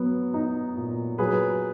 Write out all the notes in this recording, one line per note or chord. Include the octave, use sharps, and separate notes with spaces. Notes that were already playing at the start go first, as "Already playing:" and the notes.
Already playing: F#3 B3
D#4
A#2
F#3 G#4 B4